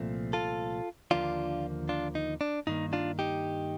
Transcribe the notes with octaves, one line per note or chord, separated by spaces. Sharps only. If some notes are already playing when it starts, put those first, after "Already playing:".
Already playing: C2 A#2 F3 A3 C4
F4 A4
D#2 D3 F3 A#3 D4 F4
D4 F4
D#4
D4
G2 D#3 A#3 D#4
D4 F4
D#4 G4